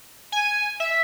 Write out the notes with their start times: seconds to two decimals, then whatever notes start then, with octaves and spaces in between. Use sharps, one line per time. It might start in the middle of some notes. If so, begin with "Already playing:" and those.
0.32 G#5
0.80 E5